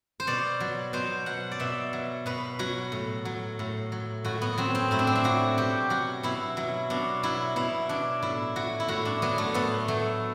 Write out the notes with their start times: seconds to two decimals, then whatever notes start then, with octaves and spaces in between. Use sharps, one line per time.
0.20 C5
0.27 B2 D5
0.60 F#3
0.93 B2 C5
1.26 F#3 F#5
1.51 D5
1.60 B2 E5
1.93 F#3
2.26 B2 B4
2.59 F#3 F#4
2.92 A2
3.25 F#3
3.59 A2
3.92 F#3
4.24 A2 F#4
4.42 B3
4.58 F#3 C4
4.75 C4
4.91 A2 E4
4.99 D4
5.07 C4
5.16 D4
5.24 F#3 F#4
5.57 B2 G4
5.90 F#3 F#4
6.23 B2 E4
6.57 F#3
6.90 B2 D4
7.23 F#3 E4
7.56 B2 E4
7.89 F#3 D4
8.22 A2 E4
8.56 F#3 F#4
8.80 E4
8.88 A2 F#4
9.05 D4
9.22 F#3 B3
9.38 A3
9.54 A2 B3
9.88 F#3 A3